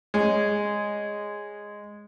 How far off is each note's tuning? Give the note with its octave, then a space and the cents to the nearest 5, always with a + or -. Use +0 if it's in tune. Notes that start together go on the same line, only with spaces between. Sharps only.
G#3 -5 C#5 +0